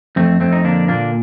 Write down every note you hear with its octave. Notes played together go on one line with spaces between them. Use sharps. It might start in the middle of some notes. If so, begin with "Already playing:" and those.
F2 A3 C4
F2 A3 C4
D#4
D3 A#3 D4
A#2 A#3 D4